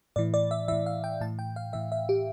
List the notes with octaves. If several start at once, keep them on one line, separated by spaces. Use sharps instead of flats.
A2 E3 D5
D5
E5
A2 E3 E5
F5
G5
A2 E3 A5
G5
F5
A2 E3 E5
E5
G4